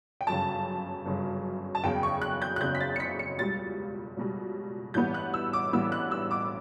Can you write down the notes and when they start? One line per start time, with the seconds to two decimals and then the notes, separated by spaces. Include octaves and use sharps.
0.21 G5
0.27 G1 F#2 C#3 A5
1.06 G1 F#2 C#3
1.75 A5
1.83 F#1 E2 C#3 G5
2.03 C#6
2.22 F#6
2.42 G6
2.56 F#6
2.61 F#1 E2 C#3 G6
2.75 B6
2.80 A6
2.96 C#7
3.00 B6
3.19 C#7
3.39 C#2 B2 G3 A6
4.17 C#2 B2 G3
4.94 A1 G2 E3 G3 B3 G6
5.14 F#6
5.34 E6
5.53 D6
5.73 A1 G2 E3 G3 B3 E6
5.92 F#6
6.11 E6
6.31 D6